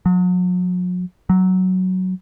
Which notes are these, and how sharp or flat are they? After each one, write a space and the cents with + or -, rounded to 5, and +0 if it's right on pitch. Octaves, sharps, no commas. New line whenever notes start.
F#3 -40
F#3 +5